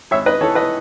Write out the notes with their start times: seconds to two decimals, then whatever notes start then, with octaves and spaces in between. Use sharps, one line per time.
0.11 G#1 C#5 E5
0.26 B4 D#5
0.41 E3 A4 C#5
0.55 B4 D#5